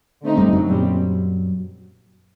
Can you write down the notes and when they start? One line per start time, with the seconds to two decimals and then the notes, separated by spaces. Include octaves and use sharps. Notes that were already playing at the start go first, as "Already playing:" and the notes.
0.22 D3 A3 C4 D#4
0.37 G2 G3
0.53 F#2 F#3
0.68 A#2 G3 C4